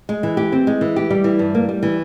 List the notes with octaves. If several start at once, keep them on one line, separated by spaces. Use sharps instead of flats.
G#3
E3
G4
C4
G#3
E3
G4
G3
E3
G2
A#3
G3
E3